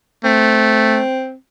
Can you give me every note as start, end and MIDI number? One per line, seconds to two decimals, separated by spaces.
0.24 1.02 57
0.24 1.34 60